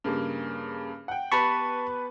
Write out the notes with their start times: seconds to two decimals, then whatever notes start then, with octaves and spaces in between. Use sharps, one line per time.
0.04 G2 C#3 A#3
1.08 F#5 G5
1.32 B3 G4 B4 A5 B5 C#6